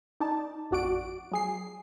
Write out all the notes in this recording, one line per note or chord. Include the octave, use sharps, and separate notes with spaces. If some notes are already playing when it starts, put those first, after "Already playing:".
D#4 D5 A5
A1 F2 F#4 D5 F#5 D7
F#3 G#4 C7